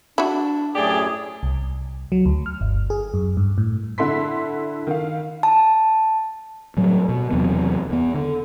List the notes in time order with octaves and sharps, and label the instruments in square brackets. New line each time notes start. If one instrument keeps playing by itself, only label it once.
[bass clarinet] D4 [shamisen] E4 F#4
[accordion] F#2 A2 G#4 [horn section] A3 G4 D5
[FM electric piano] C2
F#3
D2
F6
G1
G#4
F#2
G2
A2
[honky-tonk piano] D3 E4 A4 C6 B6
D#3 F5
[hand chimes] A5
[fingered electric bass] A2 F#3 G3 A3
B2
E2 C3 F#3 B3
E2 B3
D3